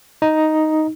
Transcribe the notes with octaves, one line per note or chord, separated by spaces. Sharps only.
D#4